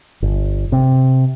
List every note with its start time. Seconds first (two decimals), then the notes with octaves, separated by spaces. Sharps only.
0.22 G1
0.72 C3